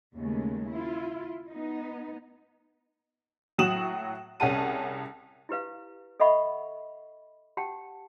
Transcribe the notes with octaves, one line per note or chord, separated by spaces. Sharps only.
D#2 C#3 G#3 A3
E4 F4
B3 D#4
A2 F#3 F#4 D#6 E7 F#7
C2 C#4 G#4 F#5 A5 D#7
E4 G4 B4 F5
A4 D#5 E5 F#5 B5 C#6
G4 F#5 G5 A5